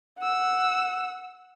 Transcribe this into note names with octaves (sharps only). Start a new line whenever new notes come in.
F#5 E6